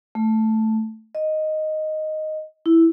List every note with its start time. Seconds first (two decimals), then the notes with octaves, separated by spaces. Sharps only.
0.15 A3
1.15 D#5
2.66 E4